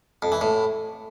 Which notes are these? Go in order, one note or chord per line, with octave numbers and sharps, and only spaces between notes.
F2
E3
A2